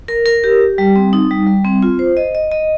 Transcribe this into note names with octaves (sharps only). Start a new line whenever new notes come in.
A#4
A#4
G4
G4
G3
C4
D#4
G3
G3
C4
F4
C5
D#5
D#5
D#5